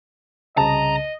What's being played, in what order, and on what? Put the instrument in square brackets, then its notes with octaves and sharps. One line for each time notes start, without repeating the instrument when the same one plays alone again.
[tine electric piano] C2 C#3 [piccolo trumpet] D#5 [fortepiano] A5 [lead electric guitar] A#5